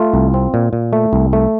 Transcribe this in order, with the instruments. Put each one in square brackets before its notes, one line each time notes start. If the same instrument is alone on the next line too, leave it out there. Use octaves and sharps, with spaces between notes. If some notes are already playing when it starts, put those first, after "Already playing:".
Already playing: [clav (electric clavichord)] A3 F4
C2
C4
A#2
A#2
A3
C2
A3